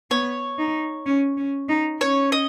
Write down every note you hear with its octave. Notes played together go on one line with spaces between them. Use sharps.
B3 C#5
D#4
C#4
C#4
D#4
C#4 C#5
D#5